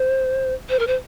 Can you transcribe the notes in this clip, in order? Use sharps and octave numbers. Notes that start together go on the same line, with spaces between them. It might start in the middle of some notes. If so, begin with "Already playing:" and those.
Already playing: C5
C5
A#4
C5